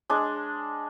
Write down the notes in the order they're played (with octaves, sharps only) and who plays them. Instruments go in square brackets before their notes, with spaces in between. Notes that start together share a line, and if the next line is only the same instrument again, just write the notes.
[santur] G#3 D4